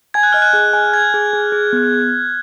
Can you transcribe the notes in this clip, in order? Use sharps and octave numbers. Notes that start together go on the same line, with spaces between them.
G#5 G#6
F#6
D#5 F6
F#6
G#4
G#5
G#5 G#6
G#4
G#4
G#4
B3